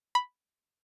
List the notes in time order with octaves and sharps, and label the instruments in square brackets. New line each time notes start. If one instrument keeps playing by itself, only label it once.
[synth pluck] B5